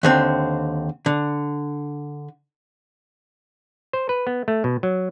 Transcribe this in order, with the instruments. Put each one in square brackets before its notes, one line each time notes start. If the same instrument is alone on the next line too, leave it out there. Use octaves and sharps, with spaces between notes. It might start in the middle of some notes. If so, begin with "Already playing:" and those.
[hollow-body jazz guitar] D#2 D3 C4
D3
[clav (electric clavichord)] C5
B4
B3
A3
B2
F#3